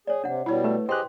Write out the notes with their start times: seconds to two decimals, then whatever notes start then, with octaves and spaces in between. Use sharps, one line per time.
0.07 G#4 C#5 D5
0.24 C3 D4 F#5
0.46 B2 G3 E4 C#5
0.64 A3 B4
0.89 G4 G#4 C5 D#5 G5 C6 F#6